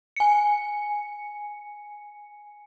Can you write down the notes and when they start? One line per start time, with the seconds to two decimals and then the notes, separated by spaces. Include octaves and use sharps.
0.16 G#5 C#7